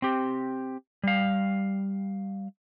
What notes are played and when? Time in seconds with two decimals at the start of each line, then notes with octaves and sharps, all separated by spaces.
0.02 C4 G4
1.03 G3 F5